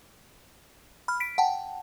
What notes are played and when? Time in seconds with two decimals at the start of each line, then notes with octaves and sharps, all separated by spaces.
1.08 B5 F6
1.20 B6 D7
1.38 F#5 G5 A5